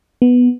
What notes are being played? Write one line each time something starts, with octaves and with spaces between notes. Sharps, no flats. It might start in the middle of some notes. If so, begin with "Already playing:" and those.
B3